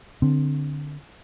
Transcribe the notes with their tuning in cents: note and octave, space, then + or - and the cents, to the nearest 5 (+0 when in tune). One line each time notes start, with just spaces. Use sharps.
D3 +0 C4 +0